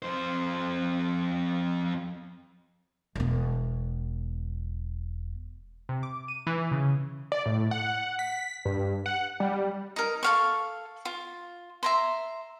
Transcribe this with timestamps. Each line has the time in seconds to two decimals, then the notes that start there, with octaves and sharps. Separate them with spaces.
0.02 F2 C5
3.15 E1 B3
5.89 C3
6.03 D6
6.28 D#7
6.47 E3
6.71 C#3
7.32 D5
7.46 A2
7.71 F#5
8.19 B6
8.65 G2
9.06 F#5
9.40 G3
9.96 D#4 A#4
10.23 A4 F5 C#6
11.05 F4
11.83 E5 A#5 C6